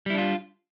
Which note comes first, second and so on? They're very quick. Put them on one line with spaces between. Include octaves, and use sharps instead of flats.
G3 E4 D4 F4